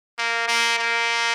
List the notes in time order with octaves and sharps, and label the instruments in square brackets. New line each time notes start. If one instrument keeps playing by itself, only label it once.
[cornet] A#3
A#3
A#3